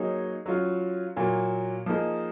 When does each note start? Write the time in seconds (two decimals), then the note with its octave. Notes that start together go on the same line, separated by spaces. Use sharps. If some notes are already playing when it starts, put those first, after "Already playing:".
Already playing: F#3 A#3 D#4 G#4 C#5
0.46 F#3 C#4 F4
1.16 A#2 F#3 A#3
1.86 F3 A#3 D#4 G#4